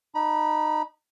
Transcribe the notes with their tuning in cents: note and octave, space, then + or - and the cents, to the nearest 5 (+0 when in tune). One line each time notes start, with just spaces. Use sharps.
D#4 -25 B5 -35